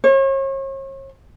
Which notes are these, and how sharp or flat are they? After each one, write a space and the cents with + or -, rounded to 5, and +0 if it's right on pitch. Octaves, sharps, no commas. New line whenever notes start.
C#5 -40